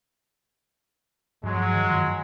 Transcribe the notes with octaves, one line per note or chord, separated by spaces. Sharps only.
G2 F3 F#3 G#3
F#2 D#3